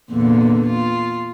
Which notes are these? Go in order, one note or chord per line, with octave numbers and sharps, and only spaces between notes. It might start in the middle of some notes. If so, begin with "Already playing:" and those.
E2 A#2 D3
F4